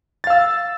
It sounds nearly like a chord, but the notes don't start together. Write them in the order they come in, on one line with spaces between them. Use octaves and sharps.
A6 F5 E6